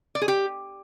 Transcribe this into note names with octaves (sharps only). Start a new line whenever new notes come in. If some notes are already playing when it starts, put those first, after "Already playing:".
D5
G#4
G4